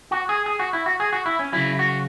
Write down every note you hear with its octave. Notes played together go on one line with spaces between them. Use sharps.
F#4
G#4
G#4
F#4
E4
F#4
G#4
F#4
E4
C#4
C#3 F#3 E4
F#4